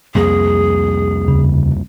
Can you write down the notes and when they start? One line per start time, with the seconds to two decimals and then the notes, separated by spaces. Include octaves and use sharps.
0.15 C2 F2 A#3 G#4
1.28 D#2 C#3